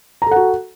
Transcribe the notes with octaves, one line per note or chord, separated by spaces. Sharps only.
F#4 A4 F#5 A#5